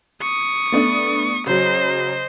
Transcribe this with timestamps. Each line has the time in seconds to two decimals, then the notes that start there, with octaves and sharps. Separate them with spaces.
0.22 C#6 D#6
0.72 A3 B3 D4
1.47 C#3 F#3 C5 D#5